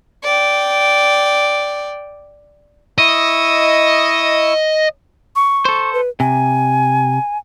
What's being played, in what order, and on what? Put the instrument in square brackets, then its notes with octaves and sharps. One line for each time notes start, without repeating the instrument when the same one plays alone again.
[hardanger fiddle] D5 G5
[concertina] E4 C#6 E6 [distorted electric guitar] D#5
[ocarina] C#6
[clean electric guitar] A4 C5
[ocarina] B4
[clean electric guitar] C3 [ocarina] G#5